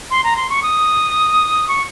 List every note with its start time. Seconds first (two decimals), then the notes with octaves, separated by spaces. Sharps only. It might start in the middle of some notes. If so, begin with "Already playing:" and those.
0.11 C6
0.24 A#5
0.36 C6
0.50 C#6
0.63 D#6
1.68 C#6